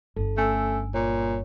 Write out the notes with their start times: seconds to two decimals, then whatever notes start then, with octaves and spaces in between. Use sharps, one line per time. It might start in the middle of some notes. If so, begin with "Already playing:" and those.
0.16 G1 G2 A4
0.37 A3 C#4 G#5 E6
0.94 A#2 C#5